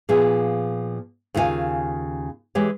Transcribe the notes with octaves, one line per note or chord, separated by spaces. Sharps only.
A#2 F3 B3 G#4
D#2 C#3 E4 F4 G#5
E3 G#3 G4 C#5